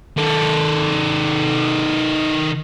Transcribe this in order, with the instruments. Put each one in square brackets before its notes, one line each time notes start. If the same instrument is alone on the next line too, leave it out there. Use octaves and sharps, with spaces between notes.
[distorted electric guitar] D#3 A4